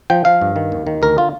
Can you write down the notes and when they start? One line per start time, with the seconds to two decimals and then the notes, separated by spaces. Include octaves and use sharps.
0.10 F3 G5
0.25 F3 F5
0.41 G2
0.56 D#3
0.72 D#2
0.87 D#3
1.02 D2 A#4
1.18 D3 F4